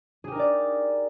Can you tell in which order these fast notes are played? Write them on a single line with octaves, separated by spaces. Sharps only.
G#4 G4 A#4 D#4 D5